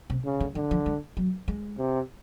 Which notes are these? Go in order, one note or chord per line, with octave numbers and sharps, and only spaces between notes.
C3
C#3
D3
D3 E3
F3
G#3
F#3
G#3
C3